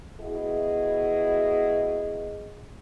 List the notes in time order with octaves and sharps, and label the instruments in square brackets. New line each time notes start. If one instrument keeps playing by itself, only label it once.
[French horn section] B2 E4 F#4 G#4 D#5